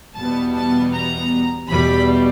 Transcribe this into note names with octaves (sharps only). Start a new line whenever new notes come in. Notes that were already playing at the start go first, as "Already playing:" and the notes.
E2 B2 G3 B3 A5
A5
A#5
E2 B2 G3 B5